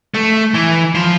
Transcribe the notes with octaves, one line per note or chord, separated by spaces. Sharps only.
A3
E3
F3